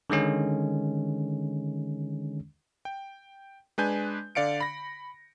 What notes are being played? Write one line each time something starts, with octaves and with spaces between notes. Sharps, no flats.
D3 D#3 G#3 C#4
G5
G#3 D4 B4 G#5 G6
D3 D5 F5 C#7 D7
B5 A#6